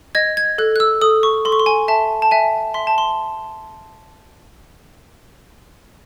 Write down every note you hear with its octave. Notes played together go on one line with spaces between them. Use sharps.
D#5 G#6
G#6
A4 F#6
F#6
E6
A4 D#6
C#6
A4 C6
C#6
C6
G#5
E5 A5
A5
E5 G#5
E5 C6
A5
C6